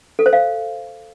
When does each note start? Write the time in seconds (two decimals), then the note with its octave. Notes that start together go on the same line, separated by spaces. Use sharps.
0.19 A4
0.26 C5
0.33 F5